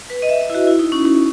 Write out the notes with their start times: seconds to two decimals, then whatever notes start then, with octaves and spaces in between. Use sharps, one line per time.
0.10 B4
0.22 D#5
0.29 E5
0.41 D#5
0.50 E4
0.55 F#4
0.67 E4
0.79 D#4
0.92 C#4
1.05 C#4